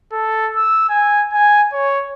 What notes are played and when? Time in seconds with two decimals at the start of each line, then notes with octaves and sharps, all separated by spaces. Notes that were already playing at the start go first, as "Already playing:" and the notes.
0.12 A4
0.56 E6
0.89 G#5
1.32 G#5
1.73 C#5